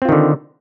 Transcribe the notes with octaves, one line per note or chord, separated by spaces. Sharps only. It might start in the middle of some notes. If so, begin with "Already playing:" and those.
D3 D#3 C4 F4